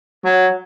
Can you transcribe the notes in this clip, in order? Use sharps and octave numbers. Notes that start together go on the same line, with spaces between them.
F#3